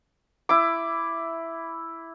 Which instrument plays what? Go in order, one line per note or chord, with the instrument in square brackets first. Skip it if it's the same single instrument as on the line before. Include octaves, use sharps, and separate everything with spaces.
[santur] E4 D6